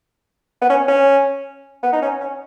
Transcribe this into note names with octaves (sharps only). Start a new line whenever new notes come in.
B3
C#4
C#4
B3
D#4
C#4
C#4